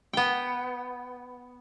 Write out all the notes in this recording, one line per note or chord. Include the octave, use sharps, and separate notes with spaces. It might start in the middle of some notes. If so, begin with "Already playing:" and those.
B3 G5